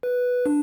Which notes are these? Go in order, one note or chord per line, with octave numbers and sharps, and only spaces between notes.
B4
D4